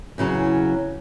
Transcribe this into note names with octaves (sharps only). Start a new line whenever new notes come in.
E2 C#3 F#3 C#4